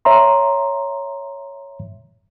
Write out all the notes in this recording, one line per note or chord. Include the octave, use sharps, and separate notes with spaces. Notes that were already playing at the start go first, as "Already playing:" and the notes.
C#5 E5 A#5 C6